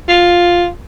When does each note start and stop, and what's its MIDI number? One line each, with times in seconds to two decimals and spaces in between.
0.08 0.67 65